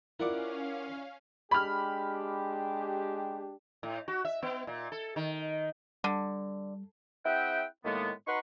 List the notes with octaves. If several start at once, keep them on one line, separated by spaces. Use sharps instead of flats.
C#4 E4 F4 A#4 D5 F5 F#5 D6
G#3 D4 G4 B5 F6
A2
F#4
E5
B3
A#2
A4
D#3
D3 G3
C4 E4 G#4 E5 F#5 G5
A2 D#3 G#3 A#3 B3
D#4 F#4 B4 A#5 C6 C#6